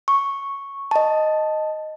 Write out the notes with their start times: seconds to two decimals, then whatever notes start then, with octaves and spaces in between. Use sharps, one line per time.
0.08 C#6
0.91 D#5 A5